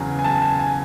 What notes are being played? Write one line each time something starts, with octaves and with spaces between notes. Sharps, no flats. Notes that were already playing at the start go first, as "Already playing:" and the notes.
Already playing: E2 C#3 F#3 G#5
G#5
A5
G#5
G#5